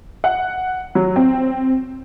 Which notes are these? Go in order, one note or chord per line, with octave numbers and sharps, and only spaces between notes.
F#5
F#3
C4